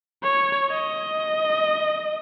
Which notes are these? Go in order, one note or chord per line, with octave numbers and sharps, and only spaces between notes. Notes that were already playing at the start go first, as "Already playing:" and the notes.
C#5
D#5